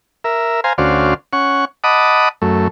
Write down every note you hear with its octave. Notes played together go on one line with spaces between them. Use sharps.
A#4 E5
C5 F5 G#5 A#5
D2 C#4 F#4 C5 D5 F5
C#4 F#5 C#6
D#5 F#5 A5 B5 D6 D#6
F#2 A3